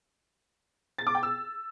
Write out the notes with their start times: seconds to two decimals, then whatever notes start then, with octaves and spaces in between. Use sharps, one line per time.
0.98 A6
1.07 D6
1.15 G5
1.23 E6